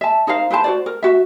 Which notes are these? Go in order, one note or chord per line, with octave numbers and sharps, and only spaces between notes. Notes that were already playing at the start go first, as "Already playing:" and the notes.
E5 A5
D#4 A#4 C5 F5
E4 B4 C5 A5
F#4 C5 D5
A#4
F#4 E5